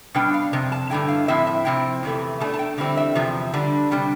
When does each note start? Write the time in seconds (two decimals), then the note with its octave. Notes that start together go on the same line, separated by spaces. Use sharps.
0.15 B2 G3 D4 G5
0.34 F5
0.53 F2 C3
0.72 A5
0.90 G2 D3 A3 E4 G5
1.08 F5
1.28 A2 F3 C4 E4 E5
1.47 E5
1.65 C3 F3 C4 E4 G5
2.03 E2 C3 E3 A3
2.40 B2 A3 D4 A5
2.54 A5
2.59 G5
2.77 E2 D3 G3 C4 E4
2.97 E5
3.15 E2 C3 F3
3.53 D3 G3 D4
3.91 C3 G3 D4